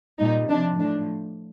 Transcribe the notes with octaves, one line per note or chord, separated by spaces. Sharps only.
A#2 G3 D#4
C3 F3 D4
A2 F3 D4